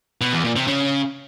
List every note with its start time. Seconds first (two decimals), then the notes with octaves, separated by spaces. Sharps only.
0.21 B2
0.33 E2
0.44 A#2
0.56 C3
0.67 C#3